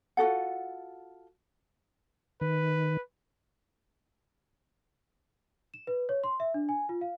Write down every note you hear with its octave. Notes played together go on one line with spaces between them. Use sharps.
F4 F#4 A4 F#5
D#3 B4
E7
B4
C#5
C6
E5
D4
G#5
F4
F5